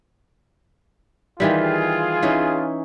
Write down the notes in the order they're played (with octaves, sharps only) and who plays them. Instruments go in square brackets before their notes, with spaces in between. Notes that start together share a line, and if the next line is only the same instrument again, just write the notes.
[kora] D#3 E3 G3 [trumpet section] F4 G#4
[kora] E3 C#4 D#4